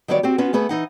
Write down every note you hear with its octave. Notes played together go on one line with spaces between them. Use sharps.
D#3 F#3 G3 B3 C#5 D5
C4 F#4 G4
B3 C#4 F4 F#4
A3 B3 G#4 B4
E3 D#4 F#5